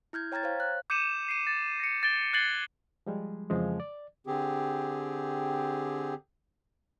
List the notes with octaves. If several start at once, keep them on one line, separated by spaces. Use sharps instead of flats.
E4 F6 G6 G#6
C#5 G5 A#5 F6 G#6 A6
C5 C#5 F5
F#6
D6 G6 C#7 D#7 E7 F#7
C7 D#7
A6
A#6 C#7
A6 D7 G7
F#6 G#6 A6 C7 F#7 G7
F3 G3 G#3
F2 C#3 E3 F3 G#3
D5
D3 C4 G4 G#4